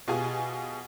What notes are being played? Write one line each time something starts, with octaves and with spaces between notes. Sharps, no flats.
B2 F4 G4 G#4 G#5